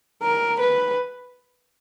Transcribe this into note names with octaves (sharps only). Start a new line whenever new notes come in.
A#4
B4